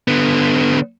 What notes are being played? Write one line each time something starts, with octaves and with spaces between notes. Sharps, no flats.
D3 B3